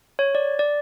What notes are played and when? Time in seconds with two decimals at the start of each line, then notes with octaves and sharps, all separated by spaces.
0.19 C#5
0.35 D5
0.59 D5